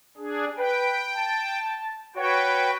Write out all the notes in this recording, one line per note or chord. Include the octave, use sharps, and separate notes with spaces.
D4 G#4
B4 G5
A5
F#4 B4 C#5 G5